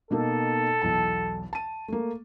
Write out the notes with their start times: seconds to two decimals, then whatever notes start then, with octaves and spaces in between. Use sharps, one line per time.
0.11 B2 A#3 D#4 A4
0.82 B1 E2 A5
1.53 A5 D#7
1.88 A3 A#3